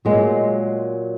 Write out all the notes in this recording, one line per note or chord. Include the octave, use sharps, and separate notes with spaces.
A#2 F#3 G#3